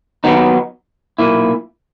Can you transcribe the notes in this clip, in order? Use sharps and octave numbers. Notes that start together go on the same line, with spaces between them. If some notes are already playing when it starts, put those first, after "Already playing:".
D#2 D#3 F#3 B3 D#4
B1 A#2 A#3 E4